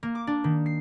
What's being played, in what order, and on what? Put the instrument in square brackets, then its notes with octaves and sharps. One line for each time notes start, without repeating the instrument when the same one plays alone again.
[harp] A#3
D6
D4
D#3
C7